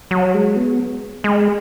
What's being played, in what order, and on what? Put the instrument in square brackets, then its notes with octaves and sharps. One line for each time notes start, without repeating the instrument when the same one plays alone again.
[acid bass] F#3
G#3
B3
G#3